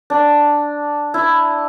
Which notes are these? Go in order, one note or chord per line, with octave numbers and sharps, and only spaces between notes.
D4
E4